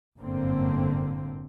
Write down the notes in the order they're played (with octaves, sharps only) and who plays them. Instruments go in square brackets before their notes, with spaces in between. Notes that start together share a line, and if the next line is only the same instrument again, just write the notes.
[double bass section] G1 F#2 A2 D3 A#3 C4